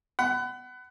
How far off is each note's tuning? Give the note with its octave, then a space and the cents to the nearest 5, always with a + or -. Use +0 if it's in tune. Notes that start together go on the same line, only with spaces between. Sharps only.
F#5 +25 B5 +30